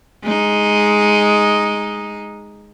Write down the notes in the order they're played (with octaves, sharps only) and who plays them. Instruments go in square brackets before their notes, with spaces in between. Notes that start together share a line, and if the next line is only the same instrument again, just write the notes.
[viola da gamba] G#3 D#4